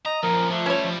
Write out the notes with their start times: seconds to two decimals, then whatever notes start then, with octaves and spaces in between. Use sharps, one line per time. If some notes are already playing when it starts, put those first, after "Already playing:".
0.06 D#5 A#5
0.23 F#2 A#2 F3 A#4
0.51 D3 A3
0.66 G3 C#4 E4 C#5
0.84 F3